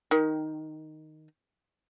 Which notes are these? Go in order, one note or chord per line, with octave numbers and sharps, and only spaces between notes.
D#3